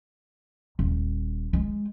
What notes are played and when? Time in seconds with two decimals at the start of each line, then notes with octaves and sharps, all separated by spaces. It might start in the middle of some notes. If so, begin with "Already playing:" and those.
0.79 D#1
1.53 G#3